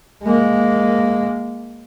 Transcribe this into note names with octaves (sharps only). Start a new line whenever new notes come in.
G#3 A#3